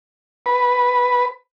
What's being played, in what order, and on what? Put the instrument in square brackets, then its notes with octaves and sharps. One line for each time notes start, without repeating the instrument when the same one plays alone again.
[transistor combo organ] B4